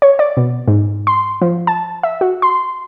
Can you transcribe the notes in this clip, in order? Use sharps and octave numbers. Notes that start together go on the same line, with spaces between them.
C#5
D5
B2
G#2
C6
F3
A5
E5
F#4
C6